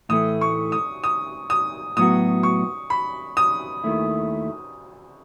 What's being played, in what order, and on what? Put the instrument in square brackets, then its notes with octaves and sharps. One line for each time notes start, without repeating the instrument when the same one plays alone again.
[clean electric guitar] A2 E3 A3 [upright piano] D#6
[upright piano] C#6
D#6
D#6
D#6
[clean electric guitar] A2 F#3 B3 F#4 [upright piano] D#6
[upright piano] C#6
B5
D#6
[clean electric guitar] D#2 D#3 A3 E4